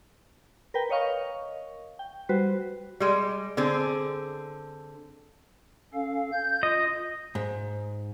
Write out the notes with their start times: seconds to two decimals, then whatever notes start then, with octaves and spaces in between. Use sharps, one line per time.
0.74 A#4 B4 G5
0.89 A#4 C#5 D#5 F5 C#6
1.99 G5
2.29 G3 F#4 B4 C5
3.00 G3 G#3
3.57 D3 C4 G#4
5.94 C#4 A4 F5
6.32 G6
6.63 F4 D#5
7.35 G#2